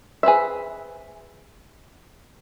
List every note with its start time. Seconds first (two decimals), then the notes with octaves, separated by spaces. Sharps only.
0.23 G#4 B4 C5 E5